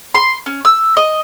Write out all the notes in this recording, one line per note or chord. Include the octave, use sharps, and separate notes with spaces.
C6
C#4
E6
D#5